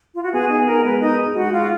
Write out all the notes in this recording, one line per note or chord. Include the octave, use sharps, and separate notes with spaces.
F4
F#4
B3 G#4
D#4 G#4
B3 A#4
G#3 B4
D#4 G#4 D#5
G#4
G#3 F#4 F#5
G#3 F4 F5